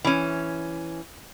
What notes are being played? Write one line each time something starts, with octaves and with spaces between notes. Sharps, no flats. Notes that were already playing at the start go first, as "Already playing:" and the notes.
E3 C#4